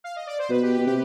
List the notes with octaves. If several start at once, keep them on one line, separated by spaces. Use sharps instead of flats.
F5
D#5
D5
C5
B2 B4
G4
G4
B2
C3 G4